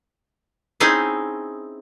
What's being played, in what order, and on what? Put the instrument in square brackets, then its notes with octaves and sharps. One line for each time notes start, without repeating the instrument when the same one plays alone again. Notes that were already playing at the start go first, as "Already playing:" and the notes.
[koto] C4 C#4 D#4 E4 G#4